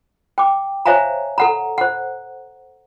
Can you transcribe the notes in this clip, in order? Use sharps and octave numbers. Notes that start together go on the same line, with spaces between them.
G5 D6
C5 C#5 E5 F5 G#5 A#5
A4 F#5 A#5
C5 F#5